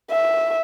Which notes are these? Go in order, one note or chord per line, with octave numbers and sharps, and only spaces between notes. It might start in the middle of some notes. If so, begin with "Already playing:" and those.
E5